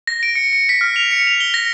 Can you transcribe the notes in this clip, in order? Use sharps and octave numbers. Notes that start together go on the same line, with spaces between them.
A#6
D7
C#7
C#7
B6
F6
F7
C#7
F7
G7
A#6